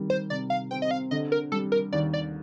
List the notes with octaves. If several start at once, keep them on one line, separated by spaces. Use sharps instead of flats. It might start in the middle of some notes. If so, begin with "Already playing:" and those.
Already playing: D#3 G3
C5
C3 D5
F5
C4 G5
D#5
F5
D3 D#5
A#4
G3 A4
A#4
D#2 D5
D5